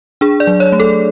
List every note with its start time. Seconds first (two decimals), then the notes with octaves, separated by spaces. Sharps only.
0.21 D4 G#4
0.40 D5
0.47 F#3
0.60 C#5
0.72 A3
0.80 A4